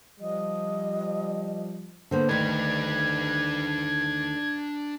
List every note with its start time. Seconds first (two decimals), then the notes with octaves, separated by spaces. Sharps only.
0.20 F3 G3 D#5
2.11 D3 A#3 B3 C5
2.29 D2 D#3 D4 B4 G#6